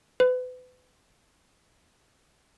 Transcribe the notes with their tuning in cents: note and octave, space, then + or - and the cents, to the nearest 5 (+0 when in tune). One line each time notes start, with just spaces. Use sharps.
B4 +35